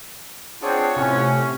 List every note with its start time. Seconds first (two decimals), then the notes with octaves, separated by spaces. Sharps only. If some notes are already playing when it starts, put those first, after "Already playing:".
0.62 C4 D4 F4 G#4 C#5 F#5
0.96 A2 C3 C#4